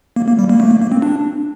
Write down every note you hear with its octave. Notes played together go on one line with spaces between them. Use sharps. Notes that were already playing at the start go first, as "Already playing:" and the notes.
A#3
A#3
G3
A#3
A3
A#3
A#3
C4
D4